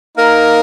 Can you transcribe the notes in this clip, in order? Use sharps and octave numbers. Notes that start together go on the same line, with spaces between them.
A#3 D#4 A#4